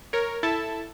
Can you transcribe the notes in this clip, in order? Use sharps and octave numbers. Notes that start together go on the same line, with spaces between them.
A#4 C#5
E4 A4 E5 A5